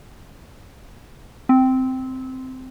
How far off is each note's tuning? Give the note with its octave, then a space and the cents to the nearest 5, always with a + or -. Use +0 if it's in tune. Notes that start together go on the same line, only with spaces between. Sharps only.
C4 -10